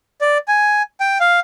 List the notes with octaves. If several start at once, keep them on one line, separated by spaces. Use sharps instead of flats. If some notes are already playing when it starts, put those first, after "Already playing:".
D5
G#5
G5
F5